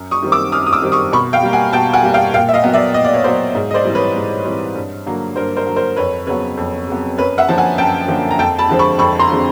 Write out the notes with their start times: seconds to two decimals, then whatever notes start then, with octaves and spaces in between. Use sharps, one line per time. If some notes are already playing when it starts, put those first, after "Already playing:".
Already playing: F#2
0.11 C#6 D#6
0.22 D#3 G3 C4
0.32 D6 E6
0.52 F#2 D#6 F6
0.67 D#6
0.73 D6 E6
0.82 D#3 G3 C4
0.92 C#6 D#6
1.12 B2 B5 C#6
1.33 F5 G5
1.43 G3 A#3
1.53 F#5 G#5
1.73 B2 G5 A5
1.93 F#5 G#5
2.03 G3 A#3
2.14 F5 G5
2.34 A#2 F5 G5
2.49 E5
2.54 D#5 F5
2.64 F#3 B3
2.73 D5 E5
2.94 A#2 D#5
3.05 D5
3.14 C#5
3.24 F#3 B3 C5 D5
3.55 G#2
3.71 D#5
3.74 C5 D5
3.85 E3 G3 C4
3.94 B4 C#5
4.16 G#2
4.45 E3 G3 C4
4.75 G2
5.06 D3 F#3 A#3
5.36 G2 A#4 C5
5.56 A#4 C5
5.67 D3 F#3 A#3
5.76 A#4 C5
5.96 F2 B4 C#5
6.26 C#3 F#3 B3 B4 C#5
6.57 F2
6.87 C#3 F#3 B3
7.17 F#2 B4 C#5
7.38 E5 F#5
7.48 D3 F3 A#3 A5
7.58 F#5 G#5
7.78 F#2 G5 A5
8.08 D3 F3 A#3
8.31 A#5
8.39 F2 G5 A5
8.58 A5 B5
8.69 D3 F3 G#3 C4
8.79 B5 C#6
8.99 F2 B5 C#6
9.19 A#5 C6
9.29 D3 F3 G#3 C4